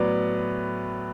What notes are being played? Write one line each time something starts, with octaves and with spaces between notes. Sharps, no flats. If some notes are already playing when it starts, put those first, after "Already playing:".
Already playing: A2 F#3 B3 B4 D5